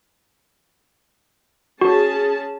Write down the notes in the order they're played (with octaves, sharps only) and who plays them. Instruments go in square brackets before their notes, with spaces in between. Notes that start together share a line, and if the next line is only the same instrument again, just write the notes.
[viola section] C#4 G#4 A5 [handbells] F#4